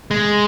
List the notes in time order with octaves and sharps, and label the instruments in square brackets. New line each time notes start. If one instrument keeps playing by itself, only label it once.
[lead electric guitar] G#3